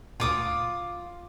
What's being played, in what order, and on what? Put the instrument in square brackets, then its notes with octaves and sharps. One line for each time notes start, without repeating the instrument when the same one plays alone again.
[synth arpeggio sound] D2 A#2 [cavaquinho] F4 D6 D#6